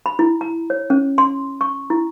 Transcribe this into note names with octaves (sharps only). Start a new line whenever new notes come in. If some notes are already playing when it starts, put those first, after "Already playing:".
B5
E4
A#5
C#5
C#4
C6
C#6
E4